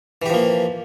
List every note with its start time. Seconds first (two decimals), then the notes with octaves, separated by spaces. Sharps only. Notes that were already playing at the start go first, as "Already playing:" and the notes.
0.22 E3
0.26 G4
0.30 F3
0.34 A#3